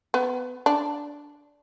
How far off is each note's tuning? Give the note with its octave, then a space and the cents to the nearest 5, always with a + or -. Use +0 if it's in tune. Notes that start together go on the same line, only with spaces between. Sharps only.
B3 +20
D4 -10